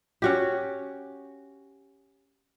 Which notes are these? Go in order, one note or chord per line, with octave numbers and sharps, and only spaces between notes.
C#4 F#4 G4